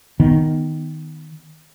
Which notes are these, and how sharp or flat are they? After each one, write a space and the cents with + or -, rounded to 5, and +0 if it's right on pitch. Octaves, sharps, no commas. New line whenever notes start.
D#3 +0 B3 +0